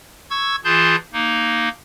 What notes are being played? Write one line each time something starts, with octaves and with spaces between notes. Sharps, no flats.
C#6 E6 G#6
E3 F4 G#4 A5 C6 G6
A#3 D#4